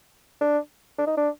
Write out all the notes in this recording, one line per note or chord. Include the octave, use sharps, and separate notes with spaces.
D4
D4
D#4
D4